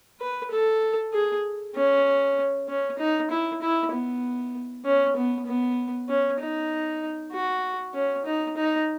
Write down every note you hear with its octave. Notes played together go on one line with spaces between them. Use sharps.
B4
A4
G#4
C#4
C#4
D#4
E4
E4
B3
C#4
B3
B3
C#4
D#4
F#4
C#4
D#4
D#4